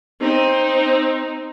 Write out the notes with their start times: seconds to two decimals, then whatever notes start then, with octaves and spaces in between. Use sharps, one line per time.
0.21 C4 D#4